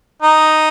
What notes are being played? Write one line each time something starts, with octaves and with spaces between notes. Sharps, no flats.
D#4